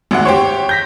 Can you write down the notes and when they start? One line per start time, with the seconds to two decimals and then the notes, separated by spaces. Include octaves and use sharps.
0.11 G#1 D2 F#5
0.25 G4 C5 C#5
0.69 G6 A#6 B6